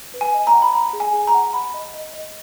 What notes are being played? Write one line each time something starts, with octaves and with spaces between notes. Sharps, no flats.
B4
G#5
D#5
A#5
F#5
B5
F#5 A#5
G#4
G#5
G#4
A#5
F#5
F#5 B5
D#5
D#5
D#5